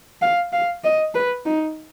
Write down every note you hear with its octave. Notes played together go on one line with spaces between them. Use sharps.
F5
F5
D#5
B4
D#4